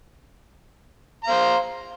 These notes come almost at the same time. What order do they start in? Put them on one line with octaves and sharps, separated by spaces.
A#5 F5 C5